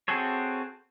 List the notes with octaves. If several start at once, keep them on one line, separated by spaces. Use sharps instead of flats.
C4 F#4 G#4 A4 C#5